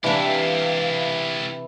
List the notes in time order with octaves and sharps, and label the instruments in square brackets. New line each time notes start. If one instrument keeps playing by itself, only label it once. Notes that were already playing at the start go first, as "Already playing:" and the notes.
[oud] C3 D4 [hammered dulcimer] E3 [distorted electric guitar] E4 G4 [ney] F5